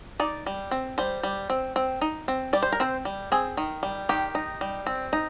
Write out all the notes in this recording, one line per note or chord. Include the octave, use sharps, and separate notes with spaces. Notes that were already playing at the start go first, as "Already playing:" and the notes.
D#4 D5
G3
C4
G3 C5
G3
C4
C4
D#4
C4
G3 D5
C5
A#4
C4 C5
G3
C4 G#4
D#3
G3
D#3 G4
D#4
G3
C4
D#4